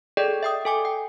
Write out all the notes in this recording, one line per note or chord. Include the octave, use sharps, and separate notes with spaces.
G#4 A4 D5 D#5 G5
E5 G5 D#6
A4 G#5 D6
G5